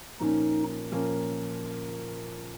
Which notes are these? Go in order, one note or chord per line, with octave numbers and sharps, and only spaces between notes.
A#2 F3 A#3 C#4 D#4
A#2 F3 A#3 C#4